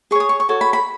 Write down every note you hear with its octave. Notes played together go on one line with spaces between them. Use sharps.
G#4 C#5 C#6
D#6
C#6
C#6
F#4 A4 C#5
B5
B5